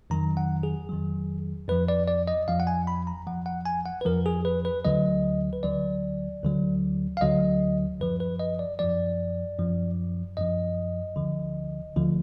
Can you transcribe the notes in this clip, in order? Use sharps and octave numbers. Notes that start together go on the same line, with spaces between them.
F2 D#3 F#3 A#5
F#5
G#4
F2 D#3 F#3
F2 F3 B4
D5
D5
D#5
F2 F3 F5
F#5
G#5
B5
A#5
F2 F3 F#5
F#5
G#5
F#5
B4
F2 F3 A#4
G#4
B4
B4
D2 D3 F#3 D#5
B4
D2 D3 F#3 D5
D2 D3 F#3
F5
D2 D3 F#3 D#5
F#2 F3 B4
B4
D#5
D5
F#2 F3 D5
F#2 F3
F#2 F3 D#5
D2 D3 F3
D2 D3 F3